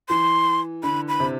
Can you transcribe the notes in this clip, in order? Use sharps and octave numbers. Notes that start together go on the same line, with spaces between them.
E3 C6
D3 B5
B5
C3